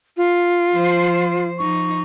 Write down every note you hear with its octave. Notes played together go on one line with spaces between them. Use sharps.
F4
F3 C5
F3 D#4 C#6